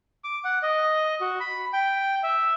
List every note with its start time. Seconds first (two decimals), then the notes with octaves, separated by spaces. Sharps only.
0.24 D6
0.44 F#5
0.63 D#5
1.21 F#4
1.40 B5
1.73 G5
2.23 E5